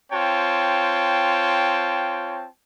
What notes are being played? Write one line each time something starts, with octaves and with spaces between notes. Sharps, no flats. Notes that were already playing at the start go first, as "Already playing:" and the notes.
C4 F4 C#5 G5 A5